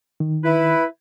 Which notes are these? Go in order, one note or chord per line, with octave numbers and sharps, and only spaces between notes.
D#3
E4 B4